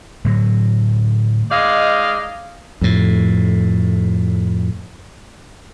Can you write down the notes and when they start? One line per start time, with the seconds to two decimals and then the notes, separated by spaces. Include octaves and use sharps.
0.25 A2 D3 F#3
1.50 G#3 D#4 D5 D#5 F5
2.81 F2 A2